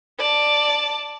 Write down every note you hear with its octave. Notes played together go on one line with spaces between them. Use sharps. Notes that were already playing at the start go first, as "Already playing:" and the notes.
D5 A5